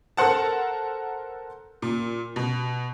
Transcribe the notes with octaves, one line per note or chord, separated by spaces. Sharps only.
A4 A#4 C5 F#5 A5
A#2
B2